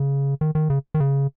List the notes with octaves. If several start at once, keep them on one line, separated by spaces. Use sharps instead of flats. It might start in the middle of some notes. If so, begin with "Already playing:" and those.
Already playing: C#3
D#3
D#3
C#3
D#3
C#3